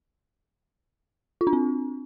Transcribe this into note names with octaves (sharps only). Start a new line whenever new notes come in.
F4
D4
C4